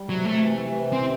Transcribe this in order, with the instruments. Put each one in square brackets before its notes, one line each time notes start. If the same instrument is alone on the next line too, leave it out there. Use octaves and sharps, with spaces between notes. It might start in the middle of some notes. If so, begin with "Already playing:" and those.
Already playing: [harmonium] G3
[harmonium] C3 [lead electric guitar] F#3
[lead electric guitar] A3
[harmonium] E3
C3
[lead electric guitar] C4